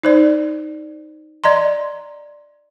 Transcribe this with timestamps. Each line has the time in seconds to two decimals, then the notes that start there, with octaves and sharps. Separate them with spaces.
0.03 D#4 C5 D5
1.44 D5 D#5 A#5 C6